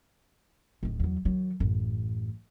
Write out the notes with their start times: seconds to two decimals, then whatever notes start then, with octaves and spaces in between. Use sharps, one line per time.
0.83 D1 D#3
1.00 E2 F#3
1.25 D#3 F#3
1.60 A1 F#2